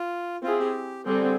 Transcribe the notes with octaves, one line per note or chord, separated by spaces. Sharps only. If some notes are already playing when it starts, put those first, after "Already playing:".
Already playing: F4
C4 E4 F4 G#4
G4
D3 G3 C4 G#4